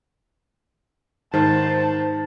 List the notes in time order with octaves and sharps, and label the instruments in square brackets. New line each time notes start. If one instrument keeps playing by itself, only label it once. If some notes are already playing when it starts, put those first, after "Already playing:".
[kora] G#2 B4 [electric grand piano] D#3 [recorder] C5 [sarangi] A5